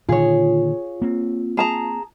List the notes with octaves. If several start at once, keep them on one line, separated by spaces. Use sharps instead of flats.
A#2 D3 D#3 F4 G#4 C#5
A#3 C4
G#4 A5 A#5